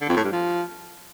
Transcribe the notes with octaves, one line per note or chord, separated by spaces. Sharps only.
D3
F2
A2
G2
F3